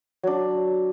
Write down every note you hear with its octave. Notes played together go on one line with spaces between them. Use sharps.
F#3 D4